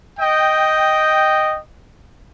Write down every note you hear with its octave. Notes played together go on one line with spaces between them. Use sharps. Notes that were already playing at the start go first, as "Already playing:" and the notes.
D#5 G5